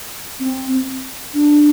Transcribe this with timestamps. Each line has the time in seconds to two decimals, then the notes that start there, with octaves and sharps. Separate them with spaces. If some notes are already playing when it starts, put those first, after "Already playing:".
0.40 C4
1.34 D4